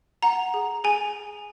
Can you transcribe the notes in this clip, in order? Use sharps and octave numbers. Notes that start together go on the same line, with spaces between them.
F#5 A#5
G#4
G#4 G#5